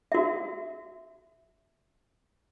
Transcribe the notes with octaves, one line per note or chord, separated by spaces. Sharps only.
F#4 E5